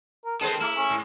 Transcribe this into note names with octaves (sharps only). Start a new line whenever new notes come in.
A#4
D#3 C4 G#4 A4 B4 C5
A3 E4
C#4
G#2